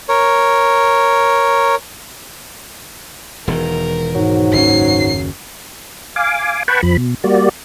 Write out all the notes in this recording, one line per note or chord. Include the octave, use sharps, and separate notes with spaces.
A#4 C#5
E1 E2 D#3 A#4
G#2 F#3
F#1 D#2 C#4 C7
F5 G#5 D6
B4 F#5 G5 A5 B5 C#6
F2 F3 B5
B2
G3 A#3 F#4 D5